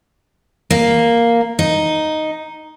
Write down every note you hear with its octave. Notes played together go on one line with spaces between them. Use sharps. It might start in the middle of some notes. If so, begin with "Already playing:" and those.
A#3
D#4